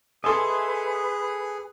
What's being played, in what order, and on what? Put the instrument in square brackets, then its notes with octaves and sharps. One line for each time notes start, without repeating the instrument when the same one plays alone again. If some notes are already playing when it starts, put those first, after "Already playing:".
[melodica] G#4 [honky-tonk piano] A4 G#5 [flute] B4 [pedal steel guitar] D#5 E5 C6